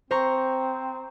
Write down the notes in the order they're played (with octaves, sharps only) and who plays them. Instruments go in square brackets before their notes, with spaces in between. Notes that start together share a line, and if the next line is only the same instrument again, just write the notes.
[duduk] C4 [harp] C5 A#5 C#6